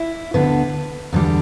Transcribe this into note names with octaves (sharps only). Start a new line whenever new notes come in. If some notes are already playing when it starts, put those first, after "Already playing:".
Already playing: E4
D2 D3 B3 B4
E2 D3 G3